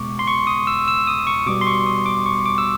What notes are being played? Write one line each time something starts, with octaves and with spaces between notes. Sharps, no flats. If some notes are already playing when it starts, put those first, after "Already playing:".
Already playing: B2 G#3 B3 C#6 D6
C6
C#6
D#6
E6
E6
D#6
C#6
B2 G3 B3 D6
C6
C#6
D#6
D6
C#6
D6
E6